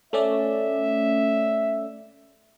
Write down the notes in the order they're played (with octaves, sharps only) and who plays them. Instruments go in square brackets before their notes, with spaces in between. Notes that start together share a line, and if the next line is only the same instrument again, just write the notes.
[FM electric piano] A3 C#4 D5 [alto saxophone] E5